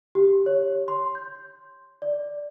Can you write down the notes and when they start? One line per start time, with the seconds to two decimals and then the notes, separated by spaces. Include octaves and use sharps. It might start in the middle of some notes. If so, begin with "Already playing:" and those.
0.15 G4
0.46 C#5
0.88 C6
1.15 G6
2.02 D5